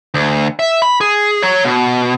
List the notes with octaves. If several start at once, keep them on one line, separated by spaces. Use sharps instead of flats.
D2
E5
B5
G#4
C#5 A#5
B2